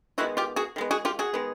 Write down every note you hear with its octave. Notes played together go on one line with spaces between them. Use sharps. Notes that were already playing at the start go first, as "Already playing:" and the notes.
D#3 G#3 B3 E4 F#4
F4 G4
F#4 G#4
D#3 G#3 B3
F#4 G#4
F4 G4
F#4 G#4
D#3 G#3 B3